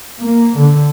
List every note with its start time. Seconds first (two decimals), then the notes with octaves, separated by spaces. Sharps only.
0.20 A#3
0.57 D3